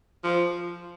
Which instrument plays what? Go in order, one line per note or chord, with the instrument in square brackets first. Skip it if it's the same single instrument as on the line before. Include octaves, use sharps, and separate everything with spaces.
[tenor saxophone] F3